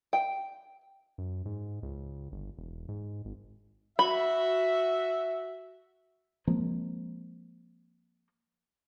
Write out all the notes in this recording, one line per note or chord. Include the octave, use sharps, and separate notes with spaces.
G5
F#2
G#2
C#2
G1
E1
G#2
G#1
F#4 E5 B5
F3 G#3 A#3 C4